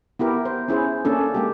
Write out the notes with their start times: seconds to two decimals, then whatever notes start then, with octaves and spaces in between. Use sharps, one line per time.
0.19 B3 E4 G4 A#4
0.45 C5
0.68 C#4 E4 G#4 C5
1.05 A#3 C#4 D4 A4
1.34 G#3 A#3 G4